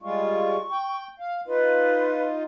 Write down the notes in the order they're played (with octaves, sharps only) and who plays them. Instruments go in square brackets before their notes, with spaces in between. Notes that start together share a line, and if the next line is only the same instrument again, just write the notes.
[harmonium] G3 G#3 F4 [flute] C#6
[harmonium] G5
F5
[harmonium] D#4 F4 [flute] B4